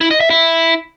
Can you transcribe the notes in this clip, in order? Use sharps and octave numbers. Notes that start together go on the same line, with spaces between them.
E4
D#5
E5
E4